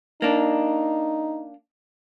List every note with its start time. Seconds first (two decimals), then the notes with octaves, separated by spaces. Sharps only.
0.22 A#3 D4 D#4